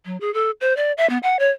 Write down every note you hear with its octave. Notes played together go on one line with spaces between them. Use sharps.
F#3
G#4
A4
C5
D5
E5
B3
F#5
C#5